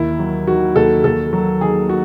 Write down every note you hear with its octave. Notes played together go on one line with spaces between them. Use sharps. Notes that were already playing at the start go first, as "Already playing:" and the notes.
Already playing: D#2 E4
F#3
D#3 F#4
D#2 A4
D#2 A4
F#3
D#3 G#4
F#4